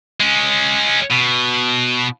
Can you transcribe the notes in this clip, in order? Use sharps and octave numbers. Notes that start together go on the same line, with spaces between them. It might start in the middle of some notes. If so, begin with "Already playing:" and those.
G#3 C#4
B2